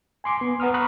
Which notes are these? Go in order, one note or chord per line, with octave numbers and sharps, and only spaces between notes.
G#5 C6 D6
B3
B4 F#5 A#5 D#6 F6
A#5 B5 C#6 D#6 F#6